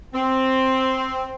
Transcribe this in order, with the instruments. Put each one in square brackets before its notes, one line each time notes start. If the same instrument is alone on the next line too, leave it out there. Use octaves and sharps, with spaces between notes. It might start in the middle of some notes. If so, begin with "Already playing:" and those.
[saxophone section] C4